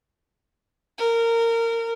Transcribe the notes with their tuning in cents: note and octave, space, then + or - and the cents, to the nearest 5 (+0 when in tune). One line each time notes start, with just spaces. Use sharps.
A#4 -20